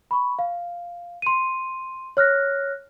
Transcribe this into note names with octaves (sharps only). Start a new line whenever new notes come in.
B5 C#6
F5
C6 D#7
C#5 F6 F#6 A#6